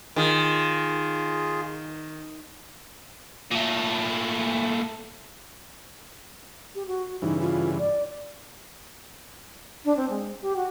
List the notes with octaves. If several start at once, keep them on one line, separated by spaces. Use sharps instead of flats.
D#3 F4 G#4
A#2 A3
G4
F#4
G2 C#3 E3 D#4
F4
D5
D4
C4
G#3
G4
F#4